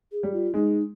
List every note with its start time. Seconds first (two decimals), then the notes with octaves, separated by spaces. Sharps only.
0.12 G#4
0.23 G3
0.33 F4
0.54 G#3 D#4